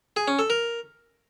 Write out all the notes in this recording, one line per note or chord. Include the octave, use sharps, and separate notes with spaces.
G#4
C#4
A4
A#4